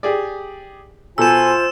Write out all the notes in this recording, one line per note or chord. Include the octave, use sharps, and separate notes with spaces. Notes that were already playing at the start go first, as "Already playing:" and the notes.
G4 G#4 D5
B2 F4 A4 C5 G#5 E6 E7